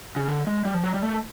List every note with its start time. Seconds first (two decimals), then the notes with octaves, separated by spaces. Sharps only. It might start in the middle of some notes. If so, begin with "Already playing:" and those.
0.16 C#3
0.28 D3
0.47 G#3
0.65 G3
0.74 F3
0.84 F#3
0.94 G3
1.02 A3